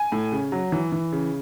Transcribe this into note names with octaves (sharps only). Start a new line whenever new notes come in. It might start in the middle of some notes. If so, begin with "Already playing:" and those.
Already playing: G#5
A2
C#3
F#3
E3
E3
C#3